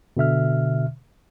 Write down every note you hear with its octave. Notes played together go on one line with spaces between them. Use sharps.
B2 D3 E5 F6